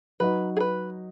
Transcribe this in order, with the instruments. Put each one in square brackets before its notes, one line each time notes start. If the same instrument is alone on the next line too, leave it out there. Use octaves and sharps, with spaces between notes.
[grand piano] F#3 D#4 F#4 [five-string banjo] B4
[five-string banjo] G#4
B4